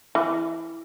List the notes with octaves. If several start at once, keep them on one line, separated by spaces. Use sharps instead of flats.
E3